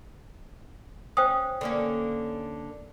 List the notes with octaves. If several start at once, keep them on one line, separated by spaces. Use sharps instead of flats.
C#4 C5 G5 D#6
D3 A#3 C#4